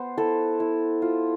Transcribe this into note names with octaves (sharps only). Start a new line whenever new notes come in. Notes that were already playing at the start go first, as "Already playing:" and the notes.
Already playing: B3 C5
E4 A4
E4
F4